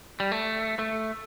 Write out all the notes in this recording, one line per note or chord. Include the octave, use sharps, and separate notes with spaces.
G3
A3
A3